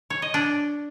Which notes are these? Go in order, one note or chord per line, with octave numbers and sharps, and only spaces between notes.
C#5
D#5
D4